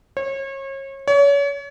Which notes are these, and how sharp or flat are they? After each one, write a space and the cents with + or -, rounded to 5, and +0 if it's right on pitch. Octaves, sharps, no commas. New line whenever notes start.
C#5 -35
C#5 +35